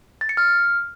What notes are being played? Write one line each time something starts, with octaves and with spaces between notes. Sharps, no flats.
A6
C#7
F6